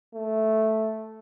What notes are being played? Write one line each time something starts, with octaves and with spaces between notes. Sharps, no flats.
A3